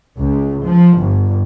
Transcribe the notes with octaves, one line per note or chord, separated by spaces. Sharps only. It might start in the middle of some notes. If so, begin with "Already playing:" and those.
C#2
F3
G1